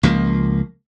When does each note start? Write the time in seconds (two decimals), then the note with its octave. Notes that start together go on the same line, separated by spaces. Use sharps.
0.03 C#2 F3 A#3